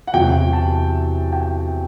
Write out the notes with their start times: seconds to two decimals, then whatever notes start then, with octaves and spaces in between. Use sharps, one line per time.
0.07 F#5
0.14 E2 C3 F#3 G5
0.53 A5
1.33 G5